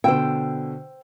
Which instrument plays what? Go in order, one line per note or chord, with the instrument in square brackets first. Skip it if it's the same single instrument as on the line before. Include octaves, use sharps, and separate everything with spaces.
[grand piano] B2 D3 E6 [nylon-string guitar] C5 G5